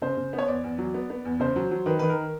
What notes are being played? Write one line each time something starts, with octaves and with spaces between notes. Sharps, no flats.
C#3 C5
C#3
B3
C#5
E2 D5
E2
F#3
B3
B3
E2
C#3 C5
F#3
F#3
D#3 B4
D#3 B4
A#4